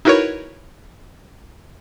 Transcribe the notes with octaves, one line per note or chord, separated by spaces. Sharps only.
D#4 E4 F#4 A#4 B4 C#5